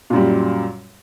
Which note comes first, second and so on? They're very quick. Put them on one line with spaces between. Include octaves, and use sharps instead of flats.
A#2 F#2 G3